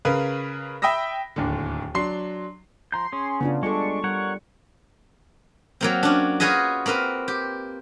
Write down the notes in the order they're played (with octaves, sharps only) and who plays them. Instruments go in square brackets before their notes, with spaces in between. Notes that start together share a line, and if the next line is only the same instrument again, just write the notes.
[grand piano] C#3 A#4 B4 F5
E5 G5 B5 D#6 E6 A#6
D1 D#2 D3
F#3 D4 C6 C7
[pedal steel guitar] F3 A#5 G6 [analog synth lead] C6
[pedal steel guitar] C#4 G#4
[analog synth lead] C#3 [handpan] B3 D4 F4
[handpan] G3 F4 A4 [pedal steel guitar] G#3 D4 [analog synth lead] C#6
[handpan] G3 [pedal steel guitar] A#4 C#5 F#5
[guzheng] F#3 A#3 C4
C#4 D4
C#4 F4 F#4 G#4 B4 D#5
A#3 C4 A#4 B4
G4